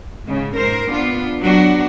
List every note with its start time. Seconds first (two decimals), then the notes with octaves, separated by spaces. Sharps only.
0.25 G#2 C#3
0.56 G#2 A#4 C5
0.90 B3 D4 F4
1.41 F#3 B3 D4 F#4